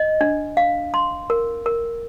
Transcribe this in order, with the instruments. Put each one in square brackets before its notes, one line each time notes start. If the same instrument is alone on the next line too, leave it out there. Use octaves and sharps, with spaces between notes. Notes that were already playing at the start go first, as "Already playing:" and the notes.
Already playing: [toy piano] D#5
D4
F5
C6
A#4
A#4